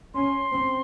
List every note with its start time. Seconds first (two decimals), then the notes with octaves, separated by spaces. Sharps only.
0.14 C#4 C6
0.53 C4